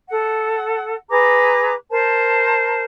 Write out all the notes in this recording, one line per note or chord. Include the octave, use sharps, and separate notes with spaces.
A4 F#5
G#4 B4 A#5 D6
A#4 C5 A5